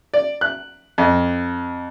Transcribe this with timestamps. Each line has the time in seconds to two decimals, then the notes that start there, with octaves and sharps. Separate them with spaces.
0.14 D5
0.41 F#6
0.98 F2